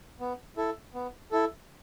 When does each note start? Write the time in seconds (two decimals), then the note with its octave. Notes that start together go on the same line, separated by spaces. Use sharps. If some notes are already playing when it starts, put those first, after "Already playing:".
0.20 B3
0.57 E4 A4
0.94 B3
1.31 E4 A4